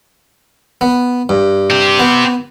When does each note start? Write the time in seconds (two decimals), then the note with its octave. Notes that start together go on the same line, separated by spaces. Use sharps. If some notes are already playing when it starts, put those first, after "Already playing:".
0.81 B3
1.29 G2
1.70 C4 G4
1.99 B3